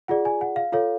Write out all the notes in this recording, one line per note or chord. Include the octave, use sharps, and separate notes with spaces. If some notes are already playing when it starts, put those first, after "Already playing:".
F4 G#4 D5 F#5
G#5
F#5
F5
F4 A4 C#5 F5